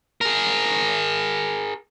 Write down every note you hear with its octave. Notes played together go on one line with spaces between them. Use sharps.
G#4 A#4